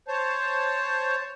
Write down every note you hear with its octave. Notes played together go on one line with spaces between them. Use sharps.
C5 C#5 A5